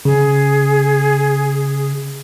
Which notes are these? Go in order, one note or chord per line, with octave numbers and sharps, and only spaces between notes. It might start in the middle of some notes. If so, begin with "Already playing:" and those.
C#3 G#4